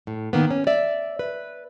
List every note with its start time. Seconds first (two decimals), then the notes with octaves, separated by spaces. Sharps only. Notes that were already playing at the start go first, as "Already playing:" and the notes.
0.07 A2
0.33 D#3 A#3 B3
0.51 C#4
0.67 D5 E5
1.19 B4